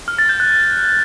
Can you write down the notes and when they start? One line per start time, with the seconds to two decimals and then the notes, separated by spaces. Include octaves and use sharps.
0.08 F6
0.18 A6
0.29 G6
0.40 F#6